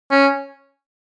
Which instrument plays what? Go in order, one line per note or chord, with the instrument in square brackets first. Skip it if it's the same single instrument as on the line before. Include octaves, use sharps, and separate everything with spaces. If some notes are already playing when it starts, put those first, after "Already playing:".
[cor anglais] C#4